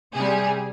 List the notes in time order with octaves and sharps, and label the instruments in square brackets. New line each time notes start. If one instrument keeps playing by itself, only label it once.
[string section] C3 G3 G#4